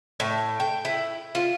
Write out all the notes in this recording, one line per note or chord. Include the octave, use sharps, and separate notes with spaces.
A2
G5
E4
F4